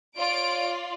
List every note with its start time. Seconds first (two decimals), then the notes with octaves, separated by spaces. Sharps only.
0.18 F4 C#5 D5 D7